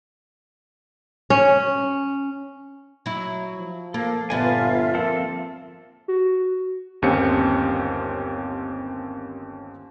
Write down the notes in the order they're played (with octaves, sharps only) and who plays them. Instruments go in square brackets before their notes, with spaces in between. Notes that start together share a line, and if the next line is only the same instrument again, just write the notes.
[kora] C#4
[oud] F#3 E4
[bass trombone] F3
[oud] A#3 [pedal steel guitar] A4 [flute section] F5
[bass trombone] G1 [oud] A#2 B3 D4 [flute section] F4 E5 [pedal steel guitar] G#5 A5
[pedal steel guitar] F3 C4 A4 [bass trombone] A#3
[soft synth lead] F#4
[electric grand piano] G1 D#2 C4 C#4 G4 C#7